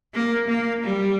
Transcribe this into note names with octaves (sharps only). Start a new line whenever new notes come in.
A#3
A#3
G3